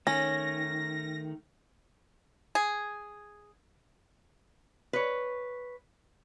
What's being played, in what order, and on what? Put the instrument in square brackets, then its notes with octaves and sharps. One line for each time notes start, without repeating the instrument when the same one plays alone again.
[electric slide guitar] D#3 A3 [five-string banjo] C#4 [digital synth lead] A#6
[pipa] G#4
[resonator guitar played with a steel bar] B4 C#5